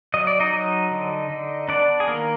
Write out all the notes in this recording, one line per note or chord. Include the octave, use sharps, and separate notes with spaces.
F#3 D#5
D5
D#4 D#5
F#3
D3
D3
B3 D4 D5
G#4
D#3 A#3 A#4